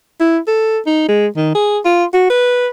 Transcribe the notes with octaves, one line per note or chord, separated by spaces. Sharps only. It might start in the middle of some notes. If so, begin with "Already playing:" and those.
E4
A4
D#4
G#3
D#3
G#4
F4
F#4
B4